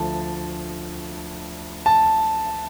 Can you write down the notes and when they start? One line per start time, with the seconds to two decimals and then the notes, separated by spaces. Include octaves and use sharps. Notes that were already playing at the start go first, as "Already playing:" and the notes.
Already playing: D2 D3 F3 A3 A5
1.86 A5